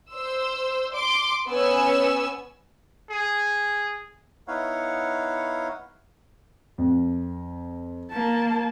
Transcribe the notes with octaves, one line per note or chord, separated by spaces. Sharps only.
C5 E6
C6 D6
B3 C#4 G#5 E6
G#4
B3 D#4 E4 C#5 F5 F#5
F2
A#3 A5